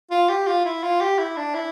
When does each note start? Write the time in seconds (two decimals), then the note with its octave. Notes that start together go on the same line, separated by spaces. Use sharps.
0.11 F4
0.30 G4
0.48 F4
0.65 E4
0.84 F4
1.01 G4
1.19 E4
1.37 D4
1.55 E4